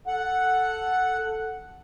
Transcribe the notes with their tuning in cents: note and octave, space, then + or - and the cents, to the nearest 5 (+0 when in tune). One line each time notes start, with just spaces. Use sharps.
A4 +0 F#5 +0